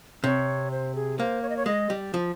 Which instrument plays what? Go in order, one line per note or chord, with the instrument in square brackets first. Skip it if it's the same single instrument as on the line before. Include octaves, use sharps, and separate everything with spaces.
[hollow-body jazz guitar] C3 [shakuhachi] C#5
[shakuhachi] C5
G#4
[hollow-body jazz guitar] A#3 [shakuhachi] C5
[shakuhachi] C#5
D#5
C#5
[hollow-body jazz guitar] G#3 [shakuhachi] D#5
[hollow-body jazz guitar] G3
F3